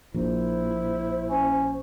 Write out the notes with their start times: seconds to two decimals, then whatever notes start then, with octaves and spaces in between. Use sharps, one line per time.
0.14 A#1 E4 C5
1.29 C#4